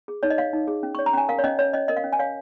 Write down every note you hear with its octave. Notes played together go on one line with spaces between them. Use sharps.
G#4
D#4 C#5
D#5
C#5 F5
D#4
G#4
C#4
C#5 C#6
A#5
C#4 G#5
A#4 F5
C#5
C#4 D#5
C#5
C#4 D#5
A#4 D#5
F5
C#4
G#5
C#5 F5